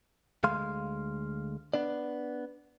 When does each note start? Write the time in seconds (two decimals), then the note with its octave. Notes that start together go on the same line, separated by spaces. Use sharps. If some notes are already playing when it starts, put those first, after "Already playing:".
0.44 D2 G#3 F5 C6
1.74 B3 D4 D5